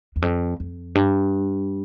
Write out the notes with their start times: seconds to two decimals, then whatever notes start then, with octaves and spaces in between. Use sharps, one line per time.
0.16 E2
0.22 F2
0.60 F2
0.95 G2